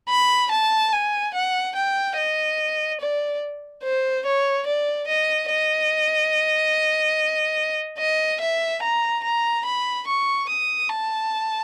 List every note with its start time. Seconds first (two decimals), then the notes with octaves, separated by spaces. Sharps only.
0.09 B5
0.51 A5
0.92 G#5
1.34 F#5
1.76 G5
2.17 D#5
3.00 D5
3.84 C5
4.26 C#5
4.67 D5
5.08 D#5
5.50 D#5
7.99 D#5
8.41 E5
8.82 A#5
9.24 A#5
9.65 B5
10.07 C#6
10.49 D#6
10.89 A5